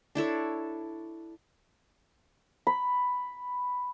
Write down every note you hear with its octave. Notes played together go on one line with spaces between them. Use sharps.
D4 E4 A4 C#5
B5